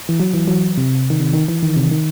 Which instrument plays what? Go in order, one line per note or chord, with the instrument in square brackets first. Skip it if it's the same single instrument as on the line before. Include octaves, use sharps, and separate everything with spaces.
[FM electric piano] E3
F#3
E3
F#3
C3
D#3
C3
D#3
E3
D#3
C3
D#3